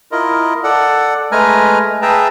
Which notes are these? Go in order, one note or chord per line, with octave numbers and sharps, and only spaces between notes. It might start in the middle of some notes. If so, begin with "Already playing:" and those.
E4 F4 A#4 D#5
A4 D5 F#5
G#3 A3 B4 G#5 A#5 F6
G#4 B4 E5 G5 A5 A#5